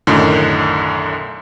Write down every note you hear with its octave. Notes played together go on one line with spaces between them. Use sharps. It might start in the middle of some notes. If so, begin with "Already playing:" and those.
B1 F#2 A2 D3 D#3